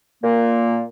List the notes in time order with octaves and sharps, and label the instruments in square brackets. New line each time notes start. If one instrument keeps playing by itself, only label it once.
[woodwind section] A#2 A#3